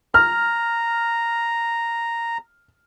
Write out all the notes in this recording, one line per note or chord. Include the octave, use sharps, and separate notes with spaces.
A#5 F6